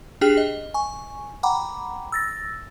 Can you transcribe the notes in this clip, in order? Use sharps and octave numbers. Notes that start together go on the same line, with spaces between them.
D4 G4 G#4 G5 F6
D#5
G#5 C#6
F#5 G5 A#5 B5 D6
E6 A6 A#6